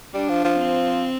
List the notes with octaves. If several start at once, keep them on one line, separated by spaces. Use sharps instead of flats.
G3 D4
F3
F3
C4